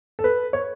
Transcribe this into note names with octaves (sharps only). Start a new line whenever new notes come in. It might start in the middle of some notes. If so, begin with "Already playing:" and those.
A4
B4
C#5